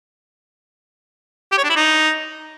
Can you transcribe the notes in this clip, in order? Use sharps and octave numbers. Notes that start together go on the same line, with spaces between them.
G4
C#5
D4
E4
D#4